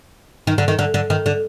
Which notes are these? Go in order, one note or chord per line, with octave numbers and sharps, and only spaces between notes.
D#3
D3
D#3
D3
D3
D#3
D3